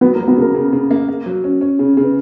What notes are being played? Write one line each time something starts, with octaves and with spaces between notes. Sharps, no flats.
F#3 B3 B4
A#3 A#4
F#3
B3 B4
C#3 A#3 A#4
C#3
C#3
A#3
A#3
F#3
C#4
C#4
C#3
C#3
B4